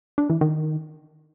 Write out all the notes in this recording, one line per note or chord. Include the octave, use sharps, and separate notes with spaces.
D4
E3
D#3